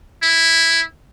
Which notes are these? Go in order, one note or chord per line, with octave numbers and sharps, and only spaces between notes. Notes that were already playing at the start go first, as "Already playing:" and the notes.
E4